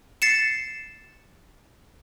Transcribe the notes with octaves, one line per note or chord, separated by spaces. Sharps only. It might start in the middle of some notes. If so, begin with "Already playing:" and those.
A6 C7 C#7 E7